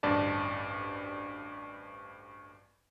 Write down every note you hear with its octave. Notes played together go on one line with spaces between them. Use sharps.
A1 D2 G2 D5 A5